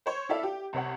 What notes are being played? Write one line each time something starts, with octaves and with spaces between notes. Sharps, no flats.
C5 C#5
E4 A4 D5 E5 F5
G4
C2 C3 C#5 F#5